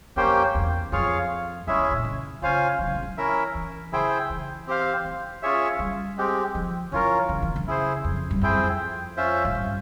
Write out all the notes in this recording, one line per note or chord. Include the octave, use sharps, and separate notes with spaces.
F2 A#3 C#4 G4 C5 G5
E2
F2 F4 G#4 C#5 F5
E2 G#3 C#4 E4 G#4 E5
E2
A#2
C#3
C#3 C#4 F4 C5 F5 G#5
F3
E3
C#3
E3
C#4 E4 A#4 E5
E3
C#3 E4 G#4 C5 G5
E3
C4 G4 C5 F5
E3
C#4 F4 G#4 C#5 E5
G3
G#3 C4 G4
F3
E3 C#4 F4 A#4
C#3
E3
C#3
E4 G#4 C5
F2
G2
F2 C4 E4 G#4 C5 G5
C#4 F4 C5 E5
G#2
G2